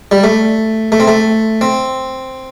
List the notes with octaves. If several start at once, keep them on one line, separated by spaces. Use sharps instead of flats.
G3
A3
A3
C4
A3
C4